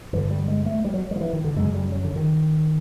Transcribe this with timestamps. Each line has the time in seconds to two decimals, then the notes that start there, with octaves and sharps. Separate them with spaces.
0.13 G2 D3 E3
0.31 G3
0.48 G#3
0.66 A3
0.85 G3
0.94 F#3
1.11 G3
1.16 F3
1.21 E3
1.33 D#3
1.44 D3
1.56 F#2 C#3 G#3
1.74 G3
1.92 F#3
2.04 D3
2.16 D#3